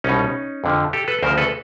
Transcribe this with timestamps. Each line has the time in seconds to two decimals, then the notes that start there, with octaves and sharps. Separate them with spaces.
0.04 C2 B2 C#4 D#4
0.64 F2 D3 F3
0.93 G4 A4
1.08 A4 B4
1.23 D2 C#3 F3 A#4 C5
1.37 A4 B4